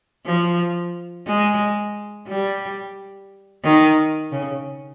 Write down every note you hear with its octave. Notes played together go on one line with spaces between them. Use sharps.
F3
G#3
G3
D#3
C#3